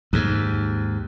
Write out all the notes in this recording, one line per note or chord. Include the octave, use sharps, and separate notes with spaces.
D#2 G#2